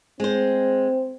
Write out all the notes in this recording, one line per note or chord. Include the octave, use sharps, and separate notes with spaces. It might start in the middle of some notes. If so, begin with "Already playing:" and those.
G#3 C4 C5